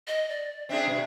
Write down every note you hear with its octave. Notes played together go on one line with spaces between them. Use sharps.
D#5
D5
C4 D4 G#4 E5
G2 B2